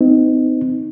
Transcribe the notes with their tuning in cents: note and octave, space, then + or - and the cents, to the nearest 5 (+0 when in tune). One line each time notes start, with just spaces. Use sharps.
C4 -40 D#4 +0